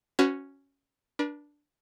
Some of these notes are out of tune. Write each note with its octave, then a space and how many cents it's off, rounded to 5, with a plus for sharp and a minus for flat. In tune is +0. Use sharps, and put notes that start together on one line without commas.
C#4 +0 F#4 +0 B4 +35
D4 +0 B4 -45